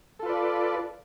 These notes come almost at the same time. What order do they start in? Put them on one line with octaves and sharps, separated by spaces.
A4 F4 B4 D5